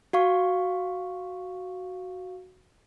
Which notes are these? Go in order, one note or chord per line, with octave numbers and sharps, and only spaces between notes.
F#4 F5 C#6